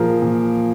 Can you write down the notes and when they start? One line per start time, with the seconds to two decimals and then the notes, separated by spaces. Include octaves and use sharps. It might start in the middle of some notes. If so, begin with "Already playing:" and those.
Already playing: A#2 F3 G#4 A#4
0.22 A#2